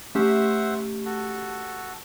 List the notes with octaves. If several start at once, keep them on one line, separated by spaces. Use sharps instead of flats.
A3 C#4 G4 C5 E5 F#5
F#4 A4